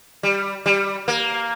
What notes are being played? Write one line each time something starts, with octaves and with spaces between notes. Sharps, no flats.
G3
G3
A#3